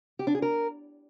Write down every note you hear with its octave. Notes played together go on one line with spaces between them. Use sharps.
G4
D4
G#4
A#4